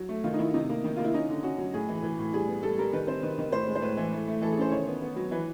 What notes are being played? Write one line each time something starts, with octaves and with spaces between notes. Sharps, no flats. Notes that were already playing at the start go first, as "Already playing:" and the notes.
Already playing: F#3
A3
D#3 F4
D#4
D#3 E4
C3 D#4
A#3
D#3
A#3 F4
E4
C#4 D#4
D3
C#4 F#4
F#3
A2 G#4
E3
E3
A2
G3 G#4
B3
G3 A4
G3 A#4
D#3 B4
C4 C5
D#3 B4
D#3
A2 C5
G#3
C5
A2 B4
E3
A3
A3
E3 A4
G#4
C#4 C5
D#3 C#5
B3
B3
F#3
E3 B4